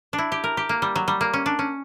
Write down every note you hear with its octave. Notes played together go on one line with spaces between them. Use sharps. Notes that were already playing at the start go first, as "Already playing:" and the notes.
D4
E4
G4
A#4
G4
A#3
G3
F#3
G3
A#3
C#4
D4
C#4